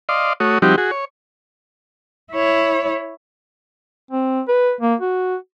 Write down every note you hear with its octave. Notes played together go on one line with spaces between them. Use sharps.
D5 D#5 F5 C6
A3 F#4 C#5 D#6
F3 G3 C4 D#4 F#4 G4
F#4 G#4
C#5
E4 C#5
C4
B4
A#3
F#4